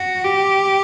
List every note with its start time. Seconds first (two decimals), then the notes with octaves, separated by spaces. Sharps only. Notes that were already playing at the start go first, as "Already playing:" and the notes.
Already playing: F#4
0.24 G4